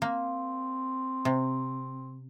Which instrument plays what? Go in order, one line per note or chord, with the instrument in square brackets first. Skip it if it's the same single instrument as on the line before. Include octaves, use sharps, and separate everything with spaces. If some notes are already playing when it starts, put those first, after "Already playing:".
[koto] A#3 [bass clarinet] C4
[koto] C3